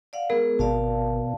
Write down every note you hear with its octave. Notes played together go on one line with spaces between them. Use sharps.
D5 F5 F#5
G#3 B3 G#4 A#4
G#1 B2 D5 F5 A5